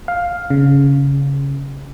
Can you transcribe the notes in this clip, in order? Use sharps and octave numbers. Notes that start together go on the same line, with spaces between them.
F5
C#3